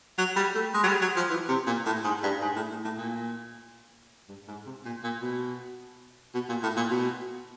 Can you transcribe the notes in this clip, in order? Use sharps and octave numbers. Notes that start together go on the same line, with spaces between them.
F#3
G3
A3
G#3
F#3
G3
F#3
F3
E3
C3
A#2
A2
G#2
G2
G#2
A2
A2
A2
A#2
G2
G#2
C3
A#2
A#2
B2
B2
A#2
A2
A#2
B2